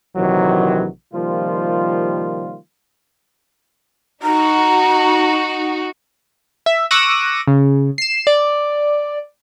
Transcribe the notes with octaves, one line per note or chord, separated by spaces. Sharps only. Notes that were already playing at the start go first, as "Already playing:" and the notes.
A#1 C3 D#3 E3 F#3
C3 D#3 F3 G3 A#3 F4
D#4 F#4 A#5
E5
C#6 D6 E6 F#6 A#6 D#7
C#3
C7 E7
D5